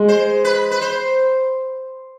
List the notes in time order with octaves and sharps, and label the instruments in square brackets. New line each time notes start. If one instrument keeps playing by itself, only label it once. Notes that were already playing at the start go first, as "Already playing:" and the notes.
Already playing: [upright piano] G#3
[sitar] C5
B4
B4
C5